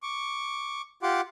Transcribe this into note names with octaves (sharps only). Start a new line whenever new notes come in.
C#6 D6
F4 G4 F#5 C6 D6